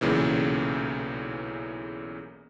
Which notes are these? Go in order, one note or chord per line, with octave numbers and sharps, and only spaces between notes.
B1 E2 A#2 C#3 E3